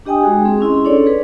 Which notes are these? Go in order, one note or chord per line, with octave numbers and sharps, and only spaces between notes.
D4 G4 D#5 G5 G#5 D#6
G#3 F#4 G#4 G#5
C4 G#4
C#4 E4 D#5 C6
C#4 D4 A4 C#5 D5
G#4 B4